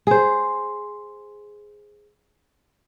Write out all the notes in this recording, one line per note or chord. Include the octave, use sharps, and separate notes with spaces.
G#4 C5